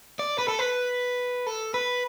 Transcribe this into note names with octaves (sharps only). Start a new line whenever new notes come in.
D5
B4
A4
B4
A4
B4